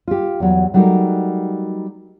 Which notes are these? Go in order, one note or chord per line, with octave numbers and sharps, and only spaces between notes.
F4 G4
E2 F#3
F#3 G3 A3 D#4 F#4 A#4